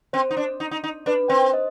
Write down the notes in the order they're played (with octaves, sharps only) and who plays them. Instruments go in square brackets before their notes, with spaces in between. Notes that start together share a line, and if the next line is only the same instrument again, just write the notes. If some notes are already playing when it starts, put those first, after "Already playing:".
[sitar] C4 [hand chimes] C5
[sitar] D#4
D4
D#4
D#4
D#4
[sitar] D4 [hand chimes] B4
[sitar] C4 [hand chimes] C5
[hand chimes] D#5